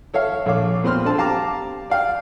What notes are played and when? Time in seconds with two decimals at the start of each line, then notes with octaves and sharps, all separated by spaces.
0.14 A4 C#5 E5 F5
0.46 A#1 A4 C#5 F5 D6
0.84 A#2 B3 C4 C6 F6
1.05 C4 D4 A4 A5
1.18 G4 F5 A5 A#5 D6
1.90 D5 F5 G5